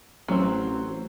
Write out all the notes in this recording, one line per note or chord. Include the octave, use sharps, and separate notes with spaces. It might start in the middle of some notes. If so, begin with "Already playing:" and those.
A1 F#3 C4